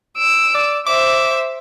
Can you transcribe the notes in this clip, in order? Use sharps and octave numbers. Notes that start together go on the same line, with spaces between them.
E6 D7
D5
C5 E5 D6